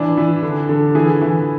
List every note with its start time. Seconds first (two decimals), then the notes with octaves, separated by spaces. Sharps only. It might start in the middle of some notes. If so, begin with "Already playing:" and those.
Already playing: E3 D4
0.17 E3
0.43 D3
0.69 D3
0.95 E3 G#4
1.21 E3